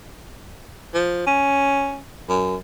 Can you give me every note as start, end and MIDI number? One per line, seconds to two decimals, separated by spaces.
0.94 1.23 53
1.27 2.02 61
2.29 2.56 42